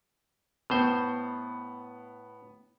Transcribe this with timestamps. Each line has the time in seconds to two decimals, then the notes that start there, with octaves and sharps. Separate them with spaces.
0.70 A2 B3 C5